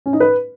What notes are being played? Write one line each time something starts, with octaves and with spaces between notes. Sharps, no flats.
C#4
D#4
B4